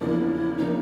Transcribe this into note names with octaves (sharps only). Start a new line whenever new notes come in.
E2 C#3 F3 A#3 D4 E4
C#3 F3 A#3 D4 D#4